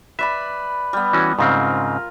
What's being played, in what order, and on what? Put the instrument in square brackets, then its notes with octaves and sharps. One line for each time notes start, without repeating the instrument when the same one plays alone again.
[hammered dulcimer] B4 D5 B5 [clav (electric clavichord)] E5
[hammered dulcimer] G3 B3
[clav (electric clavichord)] E3 C#4 F#4
[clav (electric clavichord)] G#2 C#3 C4 [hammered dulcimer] F4 A#4